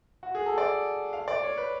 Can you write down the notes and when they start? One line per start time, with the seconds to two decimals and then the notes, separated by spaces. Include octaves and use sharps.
0.23 F#4
0.35 G#4
0.46 A4
0.58 D5
1.13 F5
1.28 D5
1.43 C#5
1.58 B4